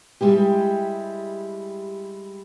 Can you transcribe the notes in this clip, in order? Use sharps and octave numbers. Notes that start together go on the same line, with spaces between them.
G3 G#3 E4 G4